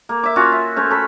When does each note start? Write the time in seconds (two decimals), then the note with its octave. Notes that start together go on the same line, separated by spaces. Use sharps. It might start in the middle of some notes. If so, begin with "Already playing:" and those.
0.09 A#3
0.23 E5 D6
0.36 C#4 F4 F#4
0.52 E5
0.76 A3 C#4 C5
0.91 A4 B5